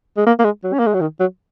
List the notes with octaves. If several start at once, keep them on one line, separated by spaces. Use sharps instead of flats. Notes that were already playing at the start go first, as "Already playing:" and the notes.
G#3
A#3
A#3
G#3
F#3
C#4
A#3
G#3
F#3
D#3
F#3